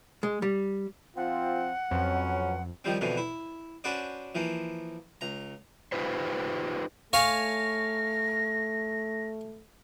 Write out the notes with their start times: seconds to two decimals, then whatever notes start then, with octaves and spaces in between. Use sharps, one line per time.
0.23 G#3
0.42 G3
1.17 F3 C4 F4 F#5
1.91 F2 F#3 C#4 B4
2.84 D#3 F3 G3 C4
3.01 F2 B2 D3 E3
3.17 E4
3.84 C#4 D4 F#4 B4 C5 D5
4.35 E3 F3 A#3
5.21 C#2 A#5
5.92 D#4 F4 G4 B4 C5
7.13 A3 C#5 F5 G#5 A#6